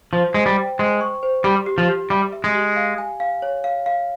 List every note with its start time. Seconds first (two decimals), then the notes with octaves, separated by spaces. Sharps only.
0.13 F3 C5
0.34 G#3 C5
0.46 G3
0.57 G5
0.79 G#3 C5
1.01 C#6
1.23 C5
1.44 G3 G4
1.66 G4
1.78 F3
1.88 G4
2.10 G3 E5
2.33 E5
2.44 G#3
2.55 G4
2.76 F5
2.98 G#5
3.20 F5
3.42 C#5
3.64 F5
3.86 F5